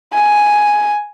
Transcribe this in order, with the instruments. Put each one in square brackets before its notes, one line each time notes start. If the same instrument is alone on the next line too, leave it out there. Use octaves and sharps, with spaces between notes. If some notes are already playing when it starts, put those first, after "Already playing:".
[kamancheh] G#5